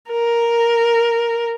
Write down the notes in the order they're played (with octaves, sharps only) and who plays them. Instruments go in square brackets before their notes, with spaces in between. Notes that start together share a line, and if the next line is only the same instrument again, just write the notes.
[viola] A#4